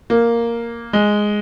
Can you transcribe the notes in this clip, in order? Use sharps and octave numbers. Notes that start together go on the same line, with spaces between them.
A#3
G#3